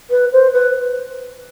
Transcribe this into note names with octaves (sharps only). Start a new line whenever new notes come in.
B4
C5
B4